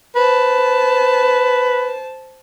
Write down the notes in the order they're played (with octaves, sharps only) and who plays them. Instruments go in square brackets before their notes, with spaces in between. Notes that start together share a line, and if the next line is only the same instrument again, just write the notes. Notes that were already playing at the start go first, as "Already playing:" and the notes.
[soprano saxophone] B4 [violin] C5 A5